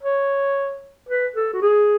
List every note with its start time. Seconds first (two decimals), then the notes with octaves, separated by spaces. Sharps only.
0.03 C#5
1.09 B4
1.36 A4
1.53 F#4
1.62 G#4